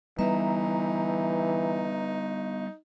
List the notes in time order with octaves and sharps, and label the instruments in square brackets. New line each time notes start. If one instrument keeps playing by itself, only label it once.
[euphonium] E3 [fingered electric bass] G3 B3 [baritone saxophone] D#4 [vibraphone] B4 E5 A#5